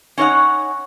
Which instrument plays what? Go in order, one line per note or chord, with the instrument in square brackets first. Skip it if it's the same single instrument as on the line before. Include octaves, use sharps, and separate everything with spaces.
[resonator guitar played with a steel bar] C#4 D#4 C#5 D#5 F#5